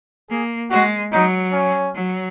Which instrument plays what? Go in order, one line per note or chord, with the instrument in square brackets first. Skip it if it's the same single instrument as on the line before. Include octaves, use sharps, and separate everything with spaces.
[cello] A#3 [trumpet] G#4
[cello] G#3 [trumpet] F#4
[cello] F#3 [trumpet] D#4
[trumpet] C#4
[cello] F#3